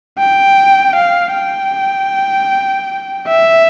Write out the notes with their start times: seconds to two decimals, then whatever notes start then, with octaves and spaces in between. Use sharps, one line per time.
0.19 G5
0.96 F5
1.34 G5
3.28 E5